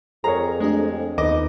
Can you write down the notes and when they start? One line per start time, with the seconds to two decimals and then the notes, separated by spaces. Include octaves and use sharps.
0.24 F2 G#4 A#4 C#5 A#5
0.60 G#3 A3 D4 G4
1.18 D#2 B3 D#4 D#5 D6